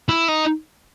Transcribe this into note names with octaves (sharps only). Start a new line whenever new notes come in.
E4
D#4